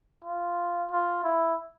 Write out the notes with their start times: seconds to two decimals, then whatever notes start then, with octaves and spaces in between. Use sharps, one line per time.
0.24 F4
0.92 F4
1.24 E4